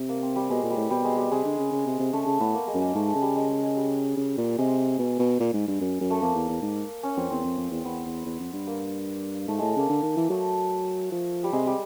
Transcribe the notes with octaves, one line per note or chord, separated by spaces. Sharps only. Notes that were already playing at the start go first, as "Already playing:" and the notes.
Already playing: C3
A#3
C4
G3
B2 G#3
A#2
G3
A2
B2 G3
G#3
G3
C3 G#3
D3
C#3
C#3
C3
C3
C#3 A3
C#3
A2 B3
A#3
G#3
F#2
G#3
G#2 A3
G#3
C#3
G3
G#3
G#3
G#3
G3
C#3
A#2
C3 G#3
B2
B2
A#2
G#2
G2
F#2
F#2
A3
F2 A#3
E2
E2
G#2
C#4
F2 C4
E2 C4
F2
F2
E2
E2 B3
E2
E2
F2
G2
A#3
G#2 A3
A2 G#3
A3
C#3 A#3
D3
D#3
E3
F#3 A3
F3
G3
C3 G#3
G3